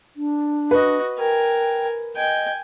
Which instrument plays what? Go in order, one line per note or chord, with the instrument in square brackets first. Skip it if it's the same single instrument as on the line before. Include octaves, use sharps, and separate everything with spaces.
[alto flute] D4
[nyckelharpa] F#4 D#5 [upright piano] B4
[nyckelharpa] A#4 G#5 [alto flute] G5
[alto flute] D#5 [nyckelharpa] G5 G#5